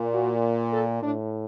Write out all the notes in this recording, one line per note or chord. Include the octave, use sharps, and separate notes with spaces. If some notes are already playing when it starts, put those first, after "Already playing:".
Already playing: A#2
F#4
A4
A2 D4